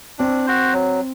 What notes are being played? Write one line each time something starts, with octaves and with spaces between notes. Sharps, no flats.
C4 D4
F#4 C5
F#3